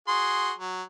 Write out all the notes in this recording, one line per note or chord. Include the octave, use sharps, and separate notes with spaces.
F#4 G#4 C6
F#3